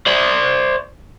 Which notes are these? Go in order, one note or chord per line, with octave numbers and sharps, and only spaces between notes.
C5 D5